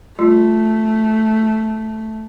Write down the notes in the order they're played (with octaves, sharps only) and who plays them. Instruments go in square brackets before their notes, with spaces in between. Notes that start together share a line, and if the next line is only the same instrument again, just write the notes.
[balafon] G3 F4 [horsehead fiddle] A3